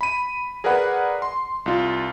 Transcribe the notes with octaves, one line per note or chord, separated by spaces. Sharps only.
B5 D#7
G#4 A#4 B4 D5 F#5 B5
C6
C2 F4